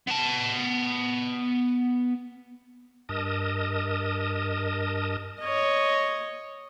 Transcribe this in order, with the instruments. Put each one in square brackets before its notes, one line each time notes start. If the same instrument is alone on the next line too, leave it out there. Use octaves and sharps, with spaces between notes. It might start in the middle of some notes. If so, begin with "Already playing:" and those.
[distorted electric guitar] B3 A5
[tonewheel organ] G2 A#4 D#5 A5 D#6
[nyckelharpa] C#5 D#5